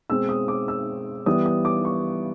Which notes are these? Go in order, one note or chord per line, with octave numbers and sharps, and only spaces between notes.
B2 G#3 C4 E6
D#6
D6
E6
E3 G3 B3 D#6
D#6
D6
C#6